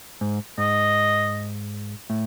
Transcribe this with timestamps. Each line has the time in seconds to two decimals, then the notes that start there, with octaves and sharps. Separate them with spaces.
0.21 G#2
0.58 G#2 D#5
2.10 A2